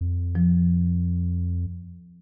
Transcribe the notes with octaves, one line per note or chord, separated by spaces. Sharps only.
F2
F3